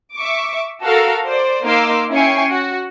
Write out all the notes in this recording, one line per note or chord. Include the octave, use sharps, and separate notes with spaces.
E5 C#6 D6
F#4 A4 A#4 F5
C5 D5
A#3 D#4 F5 C6 D6 E6
C#4 E4 G5 G#5 C#6 C7
F#4